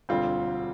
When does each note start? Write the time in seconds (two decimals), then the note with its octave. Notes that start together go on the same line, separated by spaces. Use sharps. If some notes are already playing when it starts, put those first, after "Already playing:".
0.09 E1 D2 D3 G3 C4 F4